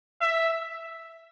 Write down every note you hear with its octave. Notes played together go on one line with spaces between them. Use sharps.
E5